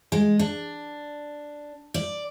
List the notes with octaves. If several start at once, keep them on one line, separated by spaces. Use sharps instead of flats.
G#3
D4
D5